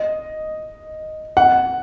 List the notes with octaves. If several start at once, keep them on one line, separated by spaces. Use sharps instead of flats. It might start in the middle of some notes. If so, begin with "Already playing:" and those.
Already playing: D#5
F#5